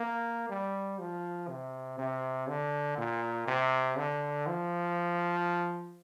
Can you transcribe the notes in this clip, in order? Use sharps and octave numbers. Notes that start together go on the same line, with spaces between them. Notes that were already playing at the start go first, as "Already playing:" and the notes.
Already playing: A#3
G3
F3
C3
C3
D3
A#2
C3
D3
F3